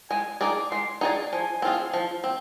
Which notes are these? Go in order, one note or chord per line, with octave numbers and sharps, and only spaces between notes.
G#3 G#5
D#4 G#4 D5 D6
G#3 C6
D#4 G#4 D5 G#5
F3 G#5
C4 F4 G#4
F3
C4